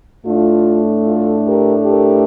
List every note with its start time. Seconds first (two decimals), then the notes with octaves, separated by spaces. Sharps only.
0.25 A2 A3 D4 F4
1.05 F4 A4
1.46 G4 A#4
1.86 G4 A#4